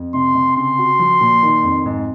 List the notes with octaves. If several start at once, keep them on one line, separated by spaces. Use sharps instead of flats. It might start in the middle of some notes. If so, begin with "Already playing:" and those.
Already playing: F2
C3 C6
C3
C#3 C6
F#4
F3
A#2
D#3
F2
G#2